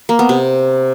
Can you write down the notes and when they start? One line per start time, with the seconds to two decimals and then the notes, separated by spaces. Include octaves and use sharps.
0.09 A#3
0.19 B3
0.29 C3